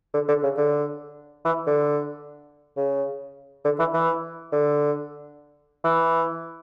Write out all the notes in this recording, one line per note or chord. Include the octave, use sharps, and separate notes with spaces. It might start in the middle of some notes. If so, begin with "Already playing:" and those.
D3
D3
C#3
D3
E3
D3
C#3
D3
E3
E3
D3
E3